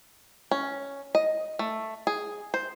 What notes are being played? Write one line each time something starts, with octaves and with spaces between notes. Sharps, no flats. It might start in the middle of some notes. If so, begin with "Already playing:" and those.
C#4
D#5
A3
G#4
C5